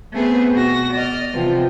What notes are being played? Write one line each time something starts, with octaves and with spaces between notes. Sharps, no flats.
A3 B3 C4 G#4 B4
B2 F#4 A#6
D5 D#5 F6
C3 E3 F3 B3 C4